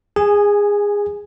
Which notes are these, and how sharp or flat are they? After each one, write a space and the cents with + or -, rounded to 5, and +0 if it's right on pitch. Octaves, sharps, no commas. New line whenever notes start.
G#4 -20 G#5 +5